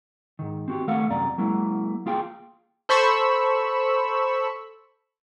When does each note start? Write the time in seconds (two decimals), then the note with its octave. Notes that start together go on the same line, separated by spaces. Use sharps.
0.39 G#2 D#3
0.68 C4 F#4 G4
0.87 D#3 A3 A4 F5 F#5
1.10 C2 F#2 C4 D5 A#5
1.38 F#3 G#3 A#3 E4
2.06 A#3 F4 G#4 G5
2.89 A4 C5 B5 C#6 E6